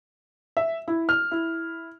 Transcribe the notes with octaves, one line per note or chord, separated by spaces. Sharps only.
E5
E4
F6
E4